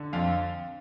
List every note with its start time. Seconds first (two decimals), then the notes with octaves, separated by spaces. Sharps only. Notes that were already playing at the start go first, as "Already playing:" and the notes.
Already playing: D3
0.13 F2 F5